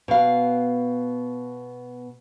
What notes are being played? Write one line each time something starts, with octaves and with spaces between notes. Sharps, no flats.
B2 F5